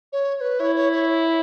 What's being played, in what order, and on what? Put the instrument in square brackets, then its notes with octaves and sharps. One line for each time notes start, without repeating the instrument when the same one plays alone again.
[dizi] C#5
C#5
B4
[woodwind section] E4 [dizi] C#5
[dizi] C#5
C#5